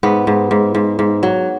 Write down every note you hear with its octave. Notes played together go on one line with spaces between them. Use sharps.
G#2 B3
G#2
G#2
G#2
G#2
F#3